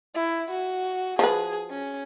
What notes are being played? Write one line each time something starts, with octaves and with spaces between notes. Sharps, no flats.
E4
F#4
F3 G#4 B4
C#4